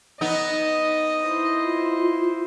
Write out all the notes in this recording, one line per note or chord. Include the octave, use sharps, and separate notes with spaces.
B3 D#4 D#5
E4 C5
F4